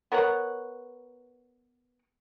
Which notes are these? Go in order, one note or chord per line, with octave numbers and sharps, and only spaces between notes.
B3 A#4 C#5 F#5